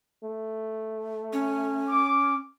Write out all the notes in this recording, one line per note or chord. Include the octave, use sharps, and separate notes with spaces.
A3
C#4
D6